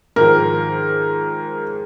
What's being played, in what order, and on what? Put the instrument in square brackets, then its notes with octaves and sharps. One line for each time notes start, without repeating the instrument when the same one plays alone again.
[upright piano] G#2 D#3 F3 [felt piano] A#4